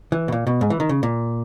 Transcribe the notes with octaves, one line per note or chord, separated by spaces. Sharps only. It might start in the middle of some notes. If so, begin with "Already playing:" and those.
E3
B2
A#2
B2
G#2
E3
D#3
C#3
A#2